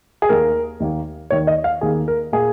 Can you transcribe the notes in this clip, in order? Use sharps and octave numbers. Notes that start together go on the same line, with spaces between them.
G#4
D#2 D#3 A#3 A#4
D#2 D#3 A#3
D#2 D#3 A#3 C#5
D#5
F5
D#2 D#3 A#3 G#4
A#4
A#2 A#3 G#4